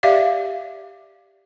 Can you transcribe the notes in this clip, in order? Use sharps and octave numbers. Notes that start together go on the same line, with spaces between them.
G4 D5 E5 F5